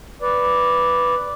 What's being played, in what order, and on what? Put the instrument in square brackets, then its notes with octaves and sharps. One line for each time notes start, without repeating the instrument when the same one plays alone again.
[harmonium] B4 D5